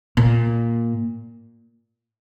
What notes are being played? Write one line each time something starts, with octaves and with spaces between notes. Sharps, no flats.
A#2